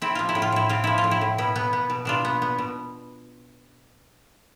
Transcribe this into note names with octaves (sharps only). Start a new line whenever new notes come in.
C4 E4
F3 F4
E4
A2
F4
A2 E4
C4 F4
F3 E4
F4
A2
E4
A2
B2 E4
B3
B3
B2
B2 D4 F4
B3
B3
B2